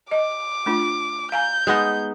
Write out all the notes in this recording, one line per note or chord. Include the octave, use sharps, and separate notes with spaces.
D#5 D6
A3 D4 F4
F5 G#5 A#5 G6
G#3 B3 D#4